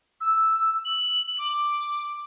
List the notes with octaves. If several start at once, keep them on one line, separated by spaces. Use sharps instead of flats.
E6
F#7
D6